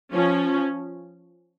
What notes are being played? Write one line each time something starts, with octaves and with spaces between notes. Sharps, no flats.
F3 C#4